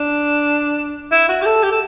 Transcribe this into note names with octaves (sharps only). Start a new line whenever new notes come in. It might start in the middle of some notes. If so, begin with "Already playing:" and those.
Already playing: D4
E4
F#4
G4
A4
G4
A4